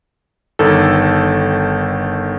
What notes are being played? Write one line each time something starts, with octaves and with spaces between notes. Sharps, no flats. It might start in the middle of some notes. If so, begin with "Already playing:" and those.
G1 D#3 A4